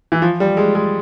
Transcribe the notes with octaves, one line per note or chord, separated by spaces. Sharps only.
E3
F3
G3
G#3
G#3